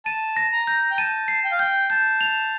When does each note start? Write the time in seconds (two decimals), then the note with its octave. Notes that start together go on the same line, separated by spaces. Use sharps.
0.05 A5 D#7
0.37 A#6
0.52 A#5
0.67 G6
0.91 G5
0.98 A5 D#7
1.28 C7
1.44 G5
1.52 F5
1.59 G5 G6
1.90 A5 G6
2.21 F7